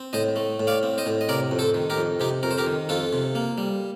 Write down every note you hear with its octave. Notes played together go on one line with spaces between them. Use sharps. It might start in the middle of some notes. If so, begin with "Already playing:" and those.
Already playing: C4
A2 C5 D#5
A3
A2
D5 F5
C4
C5 D#5
A2
D#5
C3 A#4 D5
F2
A4 C5
D#3
G4 A#4
F2
C3 D#4 G4
F2 A#4
C5
G4 A#4
D#3
F2 F4 A4
C3
A#3
G3